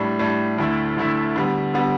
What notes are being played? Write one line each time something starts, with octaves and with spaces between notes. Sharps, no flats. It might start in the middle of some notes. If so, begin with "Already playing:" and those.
Already playing: A2 G3 D4
A2 G3 D4
D2 D3 A3 E4
D2 D3 A3 E4
D3 G3 B3
D3 G3 B3